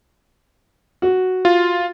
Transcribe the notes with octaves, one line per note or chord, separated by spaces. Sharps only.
F#4
F4